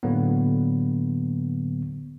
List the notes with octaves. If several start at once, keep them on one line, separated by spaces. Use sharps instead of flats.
A2 D3 F#3 A#3 B3